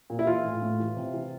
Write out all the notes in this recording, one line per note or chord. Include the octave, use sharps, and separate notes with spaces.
A#2
E4
E3 F4
A2
A2
E3
C3
E3